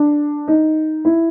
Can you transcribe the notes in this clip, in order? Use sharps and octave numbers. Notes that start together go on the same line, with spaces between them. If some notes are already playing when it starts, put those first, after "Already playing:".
Already playing: D4
D#4
E4